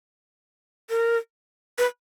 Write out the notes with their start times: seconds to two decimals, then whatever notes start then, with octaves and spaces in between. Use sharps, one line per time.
0.90 A#4
1.78 B4